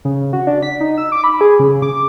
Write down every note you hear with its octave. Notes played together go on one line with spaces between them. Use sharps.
C#3
F#4
D4
B6
D#4
E6
D6
B5
G#4
C#3
D6